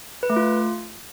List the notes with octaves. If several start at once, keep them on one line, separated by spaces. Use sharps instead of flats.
B4
A3
F4